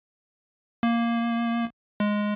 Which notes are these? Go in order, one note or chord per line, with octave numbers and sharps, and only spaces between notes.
A#3
G#3